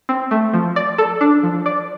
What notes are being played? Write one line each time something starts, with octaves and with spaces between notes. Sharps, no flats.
C4
A3
F3
D5
A4
D4
F3
D5